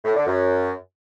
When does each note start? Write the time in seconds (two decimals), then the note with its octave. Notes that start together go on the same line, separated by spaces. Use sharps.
0.05 A2
0.16 D3
0.27 F#2